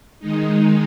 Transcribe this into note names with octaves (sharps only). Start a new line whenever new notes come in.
D#3 G#3 D#4